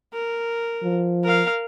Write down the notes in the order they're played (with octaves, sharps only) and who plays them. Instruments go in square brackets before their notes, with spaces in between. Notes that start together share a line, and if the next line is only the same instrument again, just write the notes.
[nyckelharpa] A#4
[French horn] F3
[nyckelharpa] A#4 F5